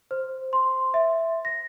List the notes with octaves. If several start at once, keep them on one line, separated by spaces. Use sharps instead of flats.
C5
C6
E5
A#6